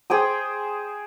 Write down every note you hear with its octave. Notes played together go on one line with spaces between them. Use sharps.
G#4 C5 G5 D#6